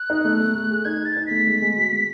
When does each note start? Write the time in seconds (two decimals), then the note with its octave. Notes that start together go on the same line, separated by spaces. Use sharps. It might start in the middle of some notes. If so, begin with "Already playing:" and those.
Already playing: F#6
0.10 D#4
0.25 A3
0.40 A3
0.55 A3
0.70 G#4
0.85 D#4 G#6
1.01 G#4 A6
1.17 D#4
1.26 A3 B6
1.47 G#3
1.62 G#3
1.77 F#4
1.93 G#3